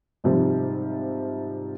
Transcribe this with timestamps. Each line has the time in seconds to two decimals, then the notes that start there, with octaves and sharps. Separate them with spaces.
0.24 G#2 C3 F3 G3